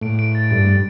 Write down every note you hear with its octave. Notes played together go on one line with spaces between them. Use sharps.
A2 D7
D7
A6
G2 A6
A6